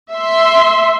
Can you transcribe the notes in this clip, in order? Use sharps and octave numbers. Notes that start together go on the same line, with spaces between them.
E5 C6